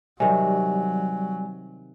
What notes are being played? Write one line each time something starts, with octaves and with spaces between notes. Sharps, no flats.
C3 D#3 F#3 G3 G#5